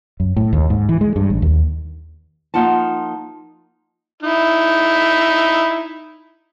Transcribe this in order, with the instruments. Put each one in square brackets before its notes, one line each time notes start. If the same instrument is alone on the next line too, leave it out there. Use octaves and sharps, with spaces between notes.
[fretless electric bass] F#2
A2
D#2
G#2
E3
G#3
G2
A1
D#2
[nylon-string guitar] F3 A#3 D#4 F4 F#5 A5
[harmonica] D#4 E4